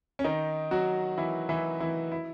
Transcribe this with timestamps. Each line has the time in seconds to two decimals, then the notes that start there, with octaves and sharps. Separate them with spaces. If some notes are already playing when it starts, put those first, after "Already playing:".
0.19 C#4
0.24 D#3 D#4
0.71 F#3 F#4
1.18 E3 E4
1.49 E3 E4
1.80 E3 E4
2.12 E4